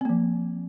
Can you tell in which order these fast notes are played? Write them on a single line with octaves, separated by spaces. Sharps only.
C4 A#3 F3